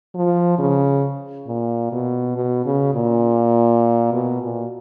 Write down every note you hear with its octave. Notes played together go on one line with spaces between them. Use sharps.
F3
C#3
A#2
B2
B2
C#3
A#2
B2
A#2